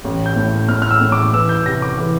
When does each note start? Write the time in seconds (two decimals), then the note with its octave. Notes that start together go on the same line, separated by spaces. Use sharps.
0.04 A1
0.26 G6
0.36 A2
0.69 A2 F6
0.82 F6
0.91 E6
1.01 A2
1.12 D6
1.33 E3 E6
1.49 G6
1.66 C3 A#6
1.82 D6
1.98 E3